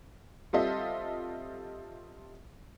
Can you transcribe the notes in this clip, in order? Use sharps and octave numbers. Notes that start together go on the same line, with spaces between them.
G3 C4 F4 A4 D#5 E5